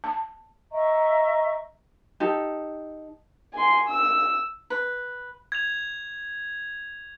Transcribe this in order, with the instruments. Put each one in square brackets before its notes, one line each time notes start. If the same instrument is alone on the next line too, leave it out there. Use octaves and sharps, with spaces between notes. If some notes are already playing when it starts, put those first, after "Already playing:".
[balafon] A5
[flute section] D#5 E5 A#5 C#6
[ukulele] D#4 G4 A4
[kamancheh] G#5 C6
E6
[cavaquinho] B4
[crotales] G#6 F7